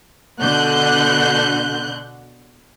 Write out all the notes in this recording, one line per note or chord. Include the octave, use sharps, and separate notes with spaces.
B2 D3 F#6 G6